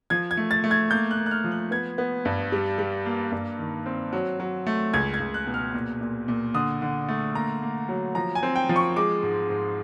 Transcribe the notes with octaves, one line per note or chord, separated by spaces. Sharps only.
F3 G#6
G#6
A3
A6
A3
G#6
A#3 G6
F#6
A#3
F#6
F6
F3
F#6
B3 G#6
B3
G2
G3
G3
A#3
G2
D#3
C4
F#3
F#3
A3
C#2 G#6
G#6
C#2
F#6
B2
F6
A#2
A#2
A#2
D3 D#6
D3
A3
A#3 A#5
A#3
F#3
F3 A#5
G#5
C4
G5
F3
C#6
G#3 D6
G#2
G#2